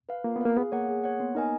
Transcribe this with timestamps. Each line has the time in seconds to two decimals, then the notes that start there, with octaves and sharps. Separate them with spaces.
0.09 B4 F5
0.24 A#3 F4
0.36 B3
0.41 A#3 B4 F5
0.57 B3 G#4
0.72 A#3 C#5 F#5
0.89 G#4
1.04 C#5 F#5
1.20 B3
1.35 D#4 A#4 D#5 G#5